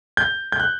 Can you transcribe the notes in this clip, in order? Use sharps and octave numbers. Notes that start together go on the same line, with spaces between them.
G6
G6
F#6